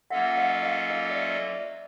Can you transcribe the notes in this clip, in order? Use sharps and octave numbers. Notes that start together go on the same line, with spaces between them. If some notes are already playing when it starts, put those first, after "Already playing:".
F#3 A#3 C#4 F4 A4 E5 F#5
F#5
D#5 F5
D#5 F5
D#5 F5
D5 E5
D5 E5
D5 E5